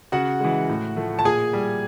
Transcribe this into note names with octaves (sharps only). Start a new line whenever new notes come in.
C#3 F#4 F#5
E3 G#3
A2
F3 A3
A5
A#2 G#4 G#5
G3